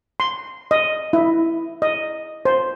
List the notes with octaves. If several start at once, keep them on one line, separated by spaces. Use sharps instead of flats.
C6
D#5
E4
D#5
C5